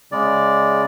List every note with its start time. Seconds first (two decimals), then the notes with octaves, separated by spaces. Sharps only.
0.12 C#3 G#3 D5